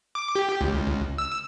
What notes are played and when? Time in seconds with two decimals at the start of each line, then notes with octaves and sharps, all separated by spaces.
0.15 D6
0.35 G4
0.61 C#2
1.18 E6